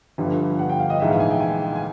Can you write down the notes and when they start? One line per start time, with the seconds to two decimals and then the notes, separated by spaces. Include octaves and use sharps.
0.18 G1 G2 D3 F3
0.59 F#5
0.69 G5
0.80 F5
0.90 D#5
1.00 A#1 G#2 E3 E5
1.10 F5
1.20 G#5
1.31 G5
1.40 G#5
1.76 G#5